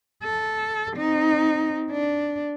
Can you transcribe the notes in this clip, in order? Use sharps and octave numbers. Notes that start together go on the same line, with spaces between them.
A4
C4 D#4
D4